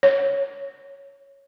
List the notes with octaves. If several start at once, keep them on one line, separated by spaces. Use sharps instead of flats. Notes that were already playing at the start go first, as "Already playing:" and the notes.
C#5